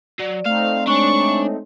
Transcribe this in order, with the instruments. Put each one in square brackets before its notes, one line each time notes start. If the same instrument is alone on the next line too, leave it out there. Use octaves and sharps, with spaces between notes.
[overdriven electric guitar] F#3 [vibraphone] D5
[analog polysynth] A3 C4 D#4 [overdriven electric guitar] F5
[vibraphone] G#3 C#5 G#5 [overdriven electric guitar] D4 [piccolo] C#6